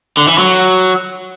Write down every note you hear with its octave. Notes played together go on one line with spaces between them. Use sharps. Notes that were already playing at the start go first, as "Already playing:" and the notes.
D3
E3
F#3